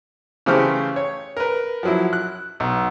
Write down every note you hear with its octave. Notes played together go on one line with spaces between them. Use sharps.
C#3 E3 A3 G4 C5 F6
C#5
A#4 B4
F3 F#3 E4
F#6
B1